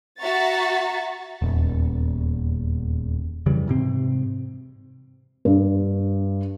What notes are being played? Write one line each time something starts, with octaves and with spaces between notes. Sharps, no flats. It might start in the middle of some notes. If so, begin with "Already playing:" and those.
F#4 E5 F#5 A#5 C#6 A6
D#1 E2
F2 C#3 E3 G3
G#2 C3 C4
G2